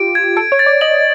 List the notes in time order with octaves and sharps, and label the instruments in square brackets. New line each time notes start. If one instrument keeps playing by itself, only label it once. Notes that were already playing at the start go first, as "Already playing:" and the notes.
Already playing: [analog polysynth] F4 G4 [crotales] D7
[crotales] G#6
[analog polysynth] A4 [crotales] D7
[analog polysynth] C#5
[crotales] A6
[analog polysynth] D5
[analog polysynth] D#5 [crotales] F#7